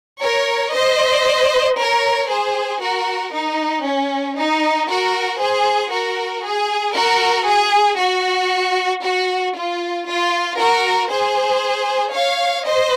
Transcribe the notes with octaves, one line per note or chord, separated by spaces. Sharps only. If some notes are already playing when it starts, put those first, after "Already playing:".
A#4 C#5
C5 D#5
A#4 C#5
G#4 C5
F#4 A#4
D#4
C#4
D#4
F#4 A#4
G#4 C5
F#4 A#4
G#4
F#4 A#4
G#4
F#4
F#4
F4
F4
F#4 A#4
G#4 C5
C#5 F5
C5 D#5